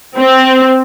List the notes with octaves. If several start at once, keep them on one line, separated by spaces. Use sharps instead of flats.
C4